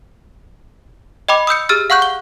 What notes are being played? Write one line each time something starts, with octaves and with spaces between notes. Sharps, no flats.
D#5 G5 B5 D6
D#6 E6 G6 C#7
G4 G#4 E6 F6 A6
F5 F#5 C#6 F#6 G6
G7